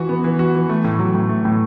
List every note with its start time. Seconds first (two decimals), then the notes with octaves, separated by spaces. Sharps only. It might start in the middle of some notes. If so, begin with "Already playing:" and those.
Already playing: E3 F#4
0.09 B3
0.24 E3
0.39 F#4
0.55 E3
0.69 A3
0.84 A2
0.99 F#3
1.15 A2
1.29 A3
1.45 A2